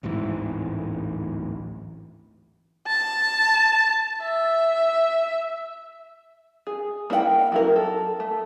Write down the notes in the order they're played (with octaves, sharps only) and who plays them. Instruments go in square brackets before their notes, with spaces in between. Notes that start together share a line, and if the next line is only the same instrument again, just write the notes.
[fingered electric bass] D1 A1 G#2 E3
[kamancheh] A5
E5
[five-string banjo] G#4
A#3 E4 G#4 F#5 G5
F#3 E4 A#4
A4
A3